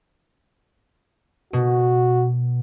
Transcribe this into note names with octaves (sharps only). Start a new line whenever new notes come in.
B2 F#4